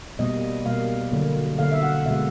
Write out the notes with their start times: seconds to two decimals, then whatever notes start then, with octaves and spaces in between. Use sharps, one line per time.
0.19 B2 G3 A#3 D#5
0.66 B2 G3 A#3 F5
1.12 D3 F#3 A#3
1.59 D3 F#3 A#3 F5
1.72 E5
1.83 F#5
1.94 F5
2.06 B2 G#3 E5